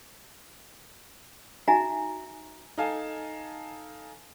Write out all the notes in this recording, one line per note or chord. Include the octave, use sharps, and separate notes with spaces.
D#4 F#4 E5 G#5 A#5
D#4 A4 F5 G#5 A5